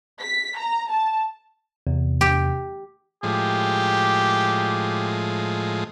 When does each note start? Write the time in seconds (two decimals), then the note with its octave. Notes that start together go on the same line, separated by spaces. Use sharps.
0.21 B6
0.57 A#5
0.90 A5
1.87 E2 C3
2.21 G4
3.23 A2 F3 G#3 G4